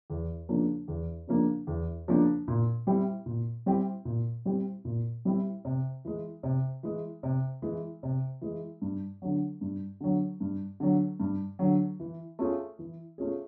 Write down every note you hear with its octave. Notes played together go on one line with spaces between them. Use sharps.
E2
C#3 F3 A#3 D4
E2
C#3 F3 A#3 D4
E2
C#3 F3 A#3 D4
A#2
G3 C4 E4 G4
A#2
G3 C4 E4 G4
A#2
G3 C4 E4 G4
A#2
G3 C4 E4 G4
C3
E3 G#3
C3
E3 G#3
C3
E3 G#3
C3
E3 G#3
G2
D3 F#3
G2
D3 F#3
G2
D3 F#3
G2
D3 F#3
E3
A3 C#4 F4 G#4
E3
A3 C#4 F4 G#4